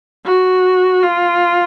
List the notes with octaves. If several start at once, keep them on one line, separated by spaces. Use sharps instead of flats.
F#4
F4